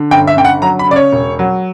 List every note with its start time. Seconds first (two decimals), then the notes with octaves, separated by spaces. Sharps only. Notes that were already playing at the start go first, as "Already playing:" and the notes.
Already playing: D3
0.11 G1 G5
0.27 E5
0.37 D3 G5
0.45 F#5
0.62 F#3 A#5
0.79 B5
0.87 C#3 D5
0.96 C#5
1.13 E1
1.39 F#3